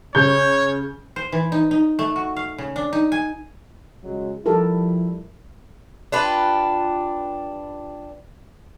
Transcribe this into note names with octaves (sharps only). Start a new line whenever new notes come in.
C#3 C#5 G6
C5
E3
D#4
D#4
A3
F#4
F5
C#3
D4
D#4
G#5
C#2 F#3 G#3
F3 G3 E4 G4 A4 A#4
D4 F4 G4 B4